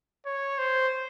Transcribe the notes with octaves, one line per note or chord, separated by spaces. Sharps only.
C#5
C5